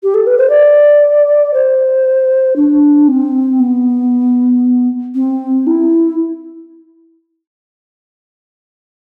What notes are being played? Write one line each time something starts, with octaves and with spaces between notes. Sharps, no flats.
G4
A4
B4
C5
D5
C5
D4
C4
B3
C4
E4